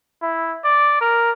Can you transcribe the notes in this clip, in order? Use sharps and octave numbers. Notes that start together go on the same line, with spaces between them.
E4
D5
A#4